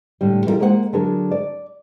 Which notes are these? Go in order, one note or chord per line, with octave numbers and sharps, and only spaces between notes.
A2 D3 G3
D3 E3 G3 E4 F4 A#4
G#3 A#3 C5 D5 F#5
D3 F#3 D4 G#4 A#4
D5